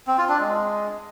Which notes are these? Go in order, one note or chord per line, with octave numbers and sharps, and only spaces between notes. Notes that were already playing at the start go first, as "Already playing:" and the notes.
C4
F4
D4
G#3